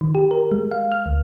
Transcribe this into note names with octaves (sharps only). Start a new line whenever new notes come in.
D#3
G4
A#4
G#3
F5
F6
D2